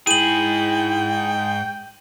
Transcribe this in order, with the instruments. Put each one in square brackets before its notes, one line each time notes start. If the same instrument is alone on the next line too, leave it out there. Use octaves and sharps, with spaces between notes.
[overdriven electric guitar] G#2 G#4 [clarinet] E4 [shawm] G5 [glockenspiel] D#7 F#7